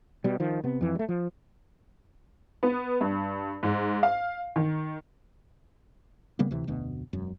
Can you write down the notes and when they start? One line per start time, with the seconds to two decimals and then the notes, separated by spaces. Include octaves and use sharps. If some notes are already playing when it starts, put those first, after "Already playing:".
0.24 B2 G3
0.40 D#3 F3
0.64 C3 B3
0.81 F2 E3
0.95 G3 A3
1.09 F3
2.63 B3
3.01 G2
3.63 G#2
4.03 F5
4.56 D#3
6.39 C#3 G3 A#3 B3
6.51 D2 C3 E3
6.67 F1 D2 B2
7.13 E1 F#2